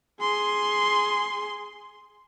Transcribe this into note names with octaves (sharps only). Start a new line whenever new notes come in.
G#4 C6